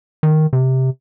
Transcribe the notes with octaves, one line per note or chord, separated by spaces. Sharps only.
D#3
C3